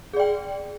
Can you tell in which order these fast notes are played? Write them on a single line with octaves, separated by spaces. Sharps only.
G#4 D5 G5